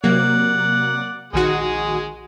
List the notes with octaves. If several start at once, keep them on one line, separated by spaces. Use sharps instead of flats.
C3 F#3 A#3 D5 F#5
A#1 D#3 G#3 F#4 G#4